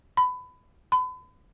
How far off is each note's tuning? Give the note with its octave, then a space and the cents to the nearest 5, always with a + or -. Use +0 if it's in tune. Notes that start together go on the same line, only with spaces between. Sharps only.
B5 +25
B5 +40